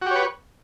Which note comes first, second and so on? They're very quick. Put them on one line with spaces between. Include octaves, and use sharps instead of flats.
F#4 G4 C#5 B4